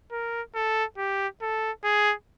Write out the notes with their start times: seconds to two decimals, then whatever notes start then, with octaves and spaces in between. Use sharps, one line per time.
0.12 A#4
0.55 A4
0.97 G4
1.41 A4
1.84 G#4